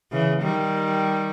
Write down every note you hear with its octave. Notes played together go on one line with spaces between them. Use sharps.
C#3 E3
D#3 G3